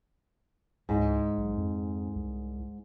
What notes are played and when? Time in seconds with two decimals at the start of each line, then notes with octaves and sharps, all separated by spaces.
0.89 C#2 G#2
1.38 B1
1.57 F2
2.16 C2